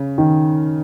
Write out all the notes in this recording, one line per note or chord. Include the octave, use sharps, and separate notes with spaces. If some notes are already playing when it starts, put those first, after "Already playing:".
Already playing: C#3
D#3